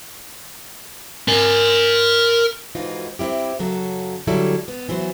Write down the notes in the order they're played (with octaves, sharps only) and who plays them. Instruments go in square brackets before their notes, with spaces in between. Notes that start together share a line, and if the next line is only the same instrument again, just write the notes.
[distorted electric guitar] A#4 G#5
[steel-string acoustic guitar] F2 G#2 E3 D#4 F4 F#4
G3 C4 C#4 E4 G4
F#2 C#3 F#3 A4
D3 F#3 G3 E4 A4
B3
E3 F#3 B3 C5